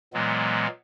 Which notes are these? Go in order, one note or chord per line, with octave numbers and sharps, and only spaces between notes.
A#2 E3 F#3 G#3 B3